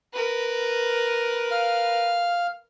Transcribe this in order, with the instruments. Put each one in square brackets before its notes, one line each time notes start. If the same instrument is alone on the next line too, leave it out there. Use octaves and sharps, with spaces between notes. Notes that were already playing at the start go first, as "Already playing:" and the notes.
[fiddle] A#4 B4
[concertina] F5